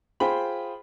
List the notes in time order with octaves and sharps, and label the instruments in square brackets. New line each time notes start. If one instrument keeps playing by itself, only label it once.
[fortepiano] F4 G#4 C5 G5 B5